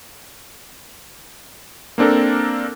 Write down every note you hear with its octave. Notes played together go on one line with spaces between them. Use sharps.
A#3 C4 D4 A4 A#4